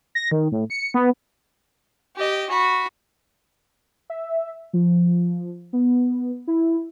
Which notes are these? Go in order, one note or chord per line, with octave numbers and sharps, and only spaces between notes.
A#6
D#3
A2
C#7
B3
G4 D#5
F#4 B5
E5
F3
B3
E4